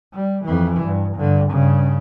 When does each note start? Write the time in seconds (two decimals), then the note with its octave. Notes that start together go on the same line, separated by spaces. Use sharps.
0.14 G3
0.45 F2 E3
0.84 G2
1.16 G2 D3
1.50 G2 C#3